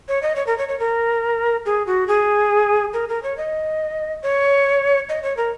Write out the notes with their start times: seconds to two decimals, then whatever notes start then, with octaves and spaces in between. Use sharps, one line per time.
0.08 C#5
0.22 D#5
0.36 C#5
0.47 A#4
0.58 C#5
0.68 C#5
0.80 A#4
1.66 G#4
1.87 F#4
2.08 G#4
2.93 A#4
3.09 A#4
3.23 C#5
3.37 D#5
4.23 C#5
5.09 D#5
5.23 C#5
5.37 A#4